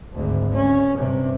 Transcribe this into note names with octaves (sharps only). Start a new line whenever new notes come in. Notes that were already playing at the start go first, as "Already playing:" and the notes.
G#1 D2
C#4
G2 C3